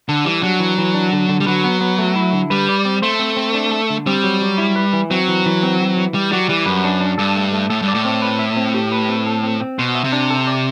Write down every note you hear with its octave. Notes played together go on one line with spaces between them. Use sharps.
D3 A4
E3 G3
F#3 D4
E3
E3
D4
D3
D3
G3
F#3 B4
B3
B3
A3
E4
D3
G3 B4
D5
C4
A3 C5
C4
C4
D4
A4
D3
G3 C4
F#3
F#3
E4
B4
E3
F#3 C4
E3
E3
C4
E3
E3
G3 G4
F#3 D5
E3 G3
F#2 B4
D4
D4
G2 A4
A3
A3
A2 A4
G2
D5
A2
C4
B4
E5
C4
G4
B4
C4
A4
C4
C4
B2 C5
E5
C3
D4
A4
D5